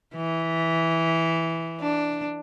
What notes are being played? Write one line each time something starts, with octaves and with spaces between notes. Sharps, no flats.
E3
D4